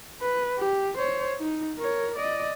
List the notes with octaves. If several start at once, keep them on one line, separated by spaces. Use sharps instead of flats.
B4
G4
C5 C#5
D#4
A#4 C#5
D5 D#5